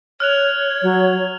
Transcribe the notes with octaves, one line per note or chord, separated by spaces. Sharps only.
C#5 F6 F#6 F7
F#3